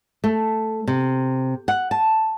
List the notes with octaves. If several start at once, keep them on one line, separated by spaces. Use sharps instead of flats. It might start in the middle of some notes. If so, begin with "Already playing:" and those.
A3
C3
F#5
A5